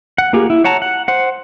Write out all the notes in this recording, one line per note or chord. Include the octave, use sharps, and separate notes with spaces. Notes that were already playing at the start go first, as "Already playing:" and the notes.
F#5
A#3 F4 G4 G#4
E4
C#5 F#5 A5 A#5
F#5
C5 F#5